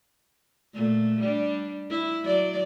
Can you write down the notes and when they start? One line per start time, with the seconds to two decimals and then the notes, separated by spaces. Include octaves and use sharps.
0.74 A#2 A3
1.21 G3 D4
1.90 E4
2.24 F#3 D5